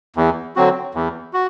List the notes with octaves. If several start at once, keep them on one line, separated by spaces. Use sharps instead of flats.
E2
D3 F#3 C4 F#4
E2
F#4